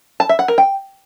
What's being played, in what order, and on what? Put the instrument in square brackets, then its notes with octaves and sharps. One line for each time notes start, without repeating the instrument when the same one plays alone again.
[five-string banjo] A5
E5
F#5
A#4
G5